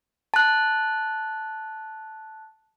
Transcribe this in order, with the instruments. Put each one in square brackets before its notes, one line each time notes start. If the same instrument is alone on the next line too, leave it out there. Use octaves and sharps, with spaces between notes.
[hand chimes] A5 F#6